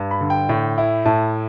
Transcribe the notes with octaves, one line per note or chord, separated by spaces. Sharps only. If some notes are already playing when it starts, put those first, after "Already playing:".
Already playing: G2
B5
D3
G5
A2
E4
A2 A5